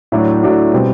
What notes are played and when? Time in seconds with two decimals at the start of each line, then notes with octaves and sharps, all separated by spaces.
0.12 A2 F#3 A3 D4 F#4
0.43 A2 F#3 A3 D4 F#4
0.74 B2 G3 C4